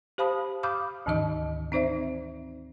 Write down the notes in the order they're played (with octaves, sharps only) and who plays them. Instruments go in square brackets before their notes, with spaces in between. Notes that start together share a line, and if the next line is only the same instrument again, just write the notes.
[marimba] G4 C5 F5 A5 B5 D#6
F5 B5 D6 D#6 F6 G6
D2 G#2 D#3 E3 D#4 D#5
C4 D#4 C5 D5 E5